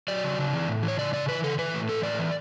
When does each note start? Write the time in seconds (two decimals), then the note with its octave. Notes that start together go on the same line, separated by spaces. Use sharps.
0.08 F#3 D5
0.24 C#3
0.38 C#3
0.53 E3
0.68 A2
0.83 E3
0.88 C#5
0.98 C#3 D5
1.13 C#3 D5
1.28 E3 B4
1.43 C#3 A4
1.58 E3 B4
1.73 A2
1.89 E3 A4
2.03 A2 D5
2.19 E3